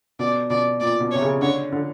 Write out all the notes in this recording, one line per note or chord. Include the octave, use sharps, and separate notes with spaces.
B2 D5
B2 D5
A#2 D5
B2
C3 C#5
C#3
D3 C#5
D3